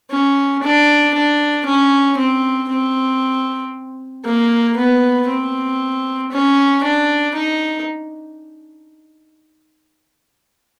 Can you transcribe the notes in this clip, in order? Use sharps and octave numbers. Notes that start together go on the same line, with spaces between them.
C#4
D4
D4
C#4
C4
C4
A#3
B3
C4
C#4
D4
D#4